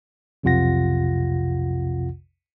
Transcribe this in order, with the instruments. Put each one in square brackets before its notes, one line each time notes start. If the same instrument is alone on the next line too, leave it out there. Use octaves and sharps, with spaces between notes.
[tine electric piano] B1 F2 C3 F4 F#5 A#6